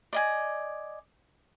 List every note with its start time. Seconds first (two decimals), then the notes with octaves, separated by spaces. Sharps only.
0.13 D5 D#5 G#5